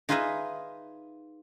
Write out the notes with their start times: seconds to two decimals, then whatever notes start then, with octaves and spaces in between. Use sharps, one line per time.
0.09 D#4 F4 G#4 B4 D#5 E5